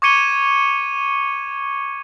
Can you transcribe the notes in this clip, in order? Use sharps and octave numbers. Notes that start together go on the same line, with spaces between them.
C#6 D6 G#6 C#7 D#7 G7